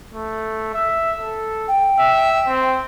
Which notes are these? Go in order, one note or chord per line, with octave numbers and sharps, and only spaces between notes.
A3
E5
A4
G5
E5
C4